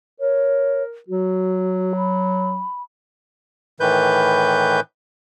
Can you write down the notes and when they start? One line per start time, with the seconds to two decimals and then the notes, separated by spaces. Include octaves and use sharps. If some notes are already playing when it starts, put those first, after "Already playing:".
0.20 A#4 C#5
1.08 F#3 F#4
1.96 B5
3.80 A2 D#3 E3 B4 G6